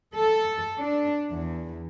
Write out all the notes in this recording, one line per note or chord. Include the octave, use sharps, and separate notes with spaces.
A4
D4
E2